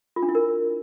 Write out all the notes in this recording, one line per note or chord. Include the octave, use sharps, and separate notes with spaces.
F4
D4
E4
A#4